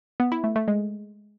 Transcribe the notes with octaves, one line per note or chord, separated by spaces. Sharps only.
B3
E4
A3
A3
G#3